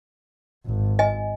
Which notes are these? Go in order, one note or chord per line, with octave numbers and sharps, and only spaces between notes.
G#1
D#5 G#5